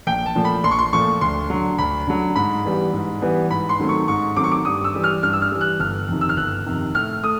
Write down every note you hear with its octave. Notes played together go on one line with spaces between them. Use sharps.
A#1 G5
A5
A#2 F3 A3
B5
A#1 C6
C#6
C6
A#2 F3 A3 C#6
D2 C6
D3 F#3
D2 B5
D3 F#3
G#2 B5
E3 G3 B3
G#2
E3 G3 B3
G#2 B5
C6
D#3 F#3 A3 C4
C#6
G#2 C#6
D#3 F#3 A3 C4 D6
C#6
D6
G2 D#6
E6
E3 G3
F6
G2 F6
E6
F6
E3 G3
F#6
G1 F6
F2 C3 D#3
E6
F6
G1 F#6
F2 C3 D#3
A2 F6
A3 D#6